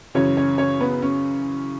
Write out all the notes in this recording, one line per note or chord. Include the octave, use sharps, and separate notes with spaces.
F#2 C#3 E3 C#4 C#5
C#4 C#5
C#4 C#5
B3 B4
C#4